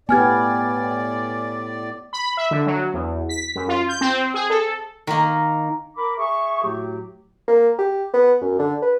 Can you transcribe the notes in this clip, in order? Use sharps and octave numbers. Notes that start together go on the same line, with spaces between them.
A2 B3 G4 D5 G#5 F6 G#6
B5
E5
D3
F#3
E2
B6
F#2
F4
G6
C4
G#4
A4
D#3 A#3
A#4 B5 D6
G#4 E5 C#6
A2 F#3 A3 F#4 G4
A#3
G4
B3
F#2
D3
B4